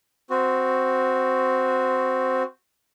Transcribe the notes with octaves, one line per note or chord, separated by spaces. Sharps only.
C4 F#4